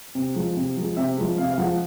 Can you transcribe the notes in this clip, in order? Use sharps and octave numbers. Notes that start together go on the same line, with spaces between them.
C3
F3 G#3
C3
F3 G#3
C3 E5
F3 G#3
C3 F5
F5
F3 G#3 F#5